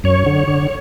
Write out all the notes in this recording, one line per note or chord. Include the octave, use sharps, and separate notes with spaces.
F#2 C#5
D3
D3